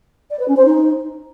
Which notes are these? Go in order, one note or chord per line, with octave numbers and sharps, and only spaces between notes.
D5
B4
C#4
C5
D#4